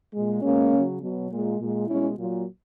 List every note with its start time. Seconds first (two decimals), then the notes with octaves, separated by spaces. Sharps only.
0.13 A#2 G#3
0.42 B2 G#3 A#3 C#4
0.72 C#3 F#3
1.00 B2 F#3
1.29 A#2 G#3
1.58 A#2 G#3
1.87 B2 G#3 C#4 E4
2.17 A#2 F#3